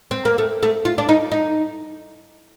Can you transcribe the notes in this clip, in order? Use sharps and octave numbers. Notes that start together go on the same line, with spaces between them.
C4
A#3
A3
A3
F4
D4
D#4
D#4